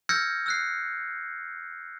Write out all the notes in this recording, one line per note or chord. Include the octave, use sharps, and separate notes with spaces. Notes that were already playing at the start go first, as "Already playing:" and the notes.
E6 F6 G6 G#6 A#6 C#7
E6 F#6 C7